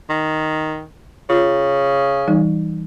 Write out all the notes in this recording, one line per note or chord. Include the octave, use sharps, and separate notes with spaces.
D#3
C#3 F4
E3 G3 D#4